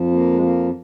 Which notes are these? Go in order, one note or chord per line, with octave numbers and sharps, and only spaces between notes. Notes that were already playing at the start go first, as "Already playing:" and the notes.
Already playing: F2 F3
A#3
G#3
A#3